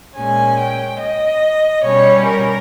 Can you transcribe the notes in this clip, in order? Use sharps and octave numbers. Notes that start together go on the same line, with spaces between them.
A#2 G#3 C#4 G#5
G5
D#5
B2 G3 C#4 C#5
A#4